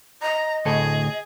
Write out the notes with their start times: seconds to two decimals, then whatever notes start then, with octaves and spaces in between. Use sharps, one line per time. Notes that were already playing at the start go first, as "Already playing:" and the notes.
0.22 D#5 A#5
0.66 D2 A2 G#4 A4